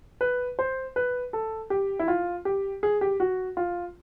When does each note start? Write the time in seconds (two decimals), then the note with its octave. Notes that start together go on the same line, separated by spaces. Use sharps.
0.21 B4
0.59 C5
0.96 B4
1.33 A4
1.70 G4
1.99 E4
2.08 F4
2.45 G4
2.83 G#4
3.01 G4
3.20 F#4
3.57 F4